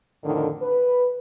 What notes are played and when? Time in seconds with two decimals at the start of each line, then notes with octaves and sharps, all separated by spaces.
0.24 F2 A2 D3 D#3
0.62 B4